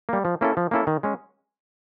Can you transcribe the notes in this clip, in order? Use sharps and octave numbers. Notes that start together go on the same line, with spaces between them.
G3 A#3
F3
A#3 C#4 E4 A4
F3
A#3 C#4 E4 A4
D#3
G#3 C#4